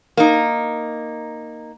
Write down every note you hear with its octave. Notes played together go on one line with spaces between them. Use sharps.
A#3 D#4